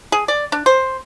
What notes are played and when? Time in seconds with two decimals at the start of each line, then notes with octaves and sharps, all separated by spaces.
0.12 G#4
0.28 D5
0.52 D4
0.66 C5